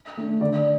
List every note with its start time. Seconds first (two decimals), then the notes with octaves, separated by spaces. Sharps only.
0.17 A3 D4
0.41 D3 D5